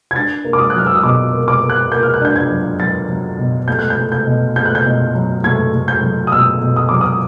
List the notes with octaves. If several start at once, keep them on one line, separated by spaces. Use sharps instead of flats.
G#6
D4 A6
A#3
D6
D#6
F#6
F#3 F6
E6
D#6
B2 D6
A#3
D6
A#3
F#6
A#3 G6
F6
F#6
D4 G6
G#6
F#3
F#3 A6
F#3
B2
A3 G6
F#6
G6
A3
G6
B2
A3 G6
F#6
G6
B2
F#3
A3 G#6
A3
G6
F#3
D#6
B2 E6
B2
D#6
F#3 D6
D#6